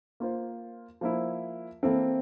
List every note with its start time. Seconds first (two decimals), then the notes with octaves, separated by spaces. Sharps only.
0.20 A#3 F4 C5
1.01 F3 A#3 E4
1.83 E3 A#3 C4 E4 A4